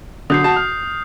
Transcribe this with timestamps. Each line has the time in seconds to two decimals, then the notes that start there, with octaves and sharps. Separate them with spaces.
0.30 D3 F#3 D#6 G6 C7
0.44 F#4 A5
0.56 F6